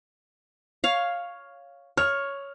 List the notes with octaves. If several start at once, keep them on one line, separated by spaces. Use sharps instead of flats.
C#5 F5
C#5 F6